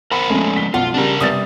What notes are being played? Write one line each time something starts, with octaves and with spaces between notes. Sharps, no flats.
A#4 C5 F#5 B5
F2 F3 G#3 A3 C#4
B6 G7
B1 F4 F#5
C#3 G3 D4 A#4
C3 G3 B3 D#6 A6